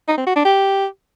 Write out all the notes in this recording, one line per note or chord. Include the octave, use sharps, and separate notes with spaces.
D#4
C4
F#4
D4
G4